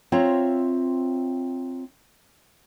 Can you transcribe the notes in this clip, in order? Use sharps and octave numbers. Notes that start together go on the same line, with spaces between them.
C4 F4 C#5 E5 A#5